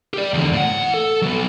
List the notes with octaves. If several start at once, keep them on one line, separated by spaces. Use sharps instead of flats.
G4 D5
E2 D3
A2 F#5
A4
F#3 B3